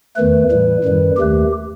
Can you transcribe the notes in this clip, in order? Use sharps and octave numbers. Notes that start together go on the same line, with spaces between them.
E2 D#3 A3 B4
A2 E3 G3
F#2 D#3 G3
D#2 D#3 A3 G4